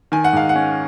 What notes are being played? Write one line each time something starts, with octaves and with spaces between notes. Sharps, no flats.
D#3 G#5
F#5
G#2 F5
F#5
C#4